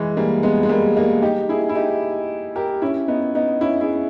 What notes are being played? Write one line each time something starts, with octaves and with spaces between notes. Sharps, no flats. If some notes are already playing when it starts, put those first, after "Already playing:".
Already playing: E3 G#3
G3 A#3
G#3 B3
G#3
G3 A#3
G3 A#3
D#4 G4
E4 G#4
E4
D#4 G4
G4 A#4
C#4 E4
B3 D#4
B3 D#4
C#4 E4
E4 G#4